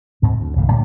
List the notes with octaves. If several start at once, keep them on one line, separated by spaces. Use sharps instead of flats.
D2 G#2 G#3 C4
D2
C2 G2 D#3 A3
A2 D3 G3 A#3